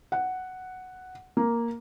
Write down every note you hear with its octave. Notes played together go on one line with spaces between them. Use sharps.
F#5
A#3